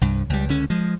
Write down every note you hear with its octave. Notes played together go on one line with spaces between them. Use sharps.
C2 G2
C#2 G3
C#2 D3 C#4
F3 G#3